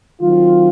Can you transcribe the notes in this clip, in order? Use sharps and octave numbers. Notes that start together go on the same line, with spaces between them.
D#3 F#3 C4 F4